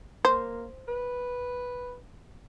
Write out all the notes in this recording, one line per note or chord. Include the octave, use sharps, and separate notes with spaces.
A#3 C5
B4